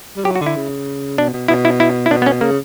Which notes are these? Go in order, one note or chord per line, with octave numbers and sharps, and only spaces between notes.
G3
F#3 G4
F#4
D3
E4
C#3
B2 D4
B2
B2 E4
E4
E4
E4
B2 D4
B3
C#4
C#3 A#3